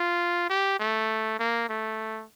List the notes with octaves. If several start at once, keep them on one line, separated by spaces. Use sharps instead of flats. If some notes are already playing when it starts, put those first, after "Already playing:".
Already playing: F4
G4
A3
A#3
A3